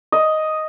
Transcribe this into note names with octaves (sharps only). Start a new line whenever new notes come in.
D#5